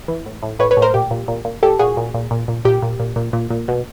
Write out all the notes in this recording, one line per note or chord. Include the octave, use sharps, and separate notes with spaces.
E3
A2
A2
A2 B4 C#5
B4 C#5
A2
A#4 C5
A#2 G4
A#2
A#2
A#2
A#2 G4 A4
A#2 F#4 G#4
A#2
A#2
A#2
A#2
A#2 G4
A#2
A#2
A#2
A#2
A#2
B2